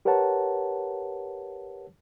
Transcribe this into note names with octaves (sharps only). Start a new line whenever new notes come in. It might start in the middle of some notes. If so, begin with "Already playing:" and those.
G4 A#4 B4 C#5 F#5 A5